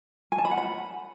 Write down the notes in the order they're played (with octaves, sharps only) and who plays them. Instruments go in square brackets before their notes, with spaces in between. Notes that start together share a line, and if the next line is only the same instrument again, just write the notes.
[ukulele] G#5
A5
B5
F#5
B5